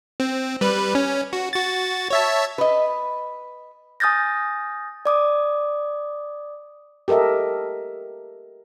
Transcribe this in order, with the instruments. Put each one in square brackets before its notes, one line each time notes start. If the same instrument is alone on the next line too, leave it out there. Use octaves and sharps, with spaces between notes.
[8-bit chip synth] C4
G3 B4
C#4
F#4
F#4 A6
C#5 E5 A5
[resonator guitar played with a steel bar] B4 D#5
[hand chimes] G#5 D#6 F6 G6 A6 A#6
D5 D6 D#6
[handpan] G4 A4 A#4 D#5 E5